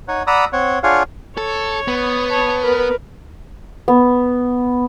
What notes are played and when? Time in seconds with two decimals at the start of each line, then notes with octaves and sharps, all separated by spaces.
0.08 D#4 C#5 F#5
0.27 D5 F#5 A#5 B5 D#6 E6
0.53 C4 C#5 F#5
0.83 D4 F4 G#4 C#5 F5 F#5
1.37 A4 C#5
1.88 B3
2.30 C#5 A5
2.63 A#4 B4
3.88 B3